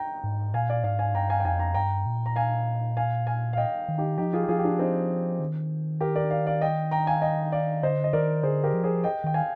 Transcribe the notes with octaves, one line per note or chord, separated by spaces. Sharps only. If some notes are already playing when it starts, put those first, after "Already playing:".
Already playing: G5 A#5
G#2
A#2 F5 G#5
D5 F5
G#2 D5 F5
F5 G#5
G2 G5 A#5
F5 G#5
G5
F2 F5 G#5
A#5
G2 G5 A#5
A#2
A#5
F5 G#5
F5 G#5
F5 G#5
F5
D#5 G5
D#3
D#4 G4
F3 D#4 G4
F4 G#4
G4
F3 F4 G#4
G4
D4 F4
C4 D#4
D#3
G4 A#4
A#4 D5
D5 F5
D5 F5
D#5 G5
G5 A#5
F5 G#5
D#5 G5
D5 F5
D3 C5 D#5
D#5
D#3 A#4 D5
D3 G#4 C5
G4 A#4
F3
G#4 C5
D#5 G5
D#3 G5
F5 G#5